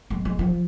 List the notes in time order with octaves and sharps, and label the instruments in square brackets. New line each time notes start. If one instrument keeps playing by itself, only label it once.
[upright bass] G#3
G#3
F3